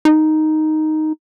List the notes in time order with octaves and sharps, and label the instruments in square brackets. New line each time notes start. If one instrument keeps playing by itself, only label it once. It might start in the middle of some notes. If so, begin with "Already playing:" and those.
[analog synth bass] D#4